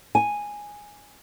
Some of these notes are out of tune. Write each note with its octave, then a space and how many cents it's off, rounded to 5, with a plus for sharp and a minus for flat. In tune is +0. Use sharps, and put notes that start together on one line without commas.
G#5 -5